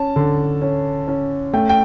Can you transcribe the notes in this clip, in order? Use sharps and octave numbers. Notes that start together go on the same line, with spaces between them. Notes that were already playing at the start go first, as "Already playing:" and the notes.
Already playing: C#4 A5
D3
C#4
C#4
A3 G5
G5